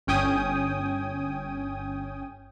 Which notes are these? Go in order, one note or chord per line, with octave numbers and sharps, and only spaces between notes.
G1 C#4 G5 G#5 D#6